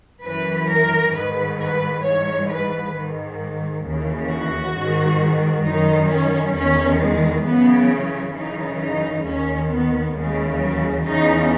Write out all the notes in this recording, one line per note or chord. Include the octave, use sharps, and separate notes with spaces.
F#2 E3 B4
A#4
G#2 D#3 B4
B4
G#2 E3 C#5
B4
G#2 D#3
D#2 C#3 E3
F#4
G#2 D#3
F#2 D#3 D#4
C#4
E2 D#3 C#4
G#3
F#2 C#3 E3 B3
C#4
F#2 C#3 E3 D#4
D#4
D#2 D#3 C#4
B3
D#2 C#3 E3 G#3
F#3
E2 C#3 E3 D#4